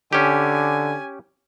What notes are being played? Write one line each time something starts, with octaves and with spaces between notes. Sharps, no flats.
D3 C#4 G4 G#5